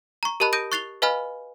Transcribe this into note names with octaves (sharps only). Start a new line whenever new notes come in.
A#5 C#6
G4 A#4 D#5 A5 B5 F#6
D#6 G6 A#6 D7 D#7
C#6 F#6 A6 C7 F7 G7
B4 D#5 F5 G#5 B5 F6